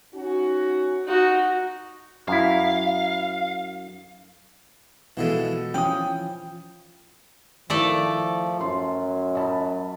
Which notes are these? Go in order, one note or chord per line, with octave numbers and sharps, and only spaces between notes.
C#4 D#4 F#4
D#4 F#4
F#2 E4 F5
B2 E3 F3 G#3 B3 A4
E3 F3 C#4 G5 D6 D#6
D#3 F3 A3 E4 A4 A#4 D5
F#2 C6
D#5 A5 B5